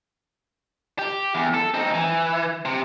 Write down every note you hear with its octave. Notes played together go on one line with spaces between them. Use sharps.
G4
E2
A4
C4 D#4
E3
C3